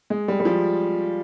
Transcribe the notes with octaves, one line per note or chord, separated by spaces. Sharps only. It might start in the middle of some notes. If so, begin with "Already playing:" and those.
G#3
G3
G3
F3